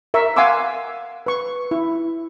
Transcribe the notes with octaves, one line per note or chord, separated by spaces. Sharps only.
A#4 E5 C#6
F5 F#5 G#5 C6 D6 E6
B4 C#6
E4